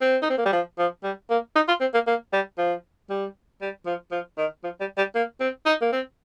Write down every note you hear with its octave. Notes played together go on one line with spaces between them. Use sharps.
C4
D#4
C4
A#3
G3
F3
F3
G3
A#3
D#4
F4
C4
A#3
A#3
G3
F3
G3
G3
F3
F3
D#3
F3
G3
G3
A#3
C4
D#4
A#3
C4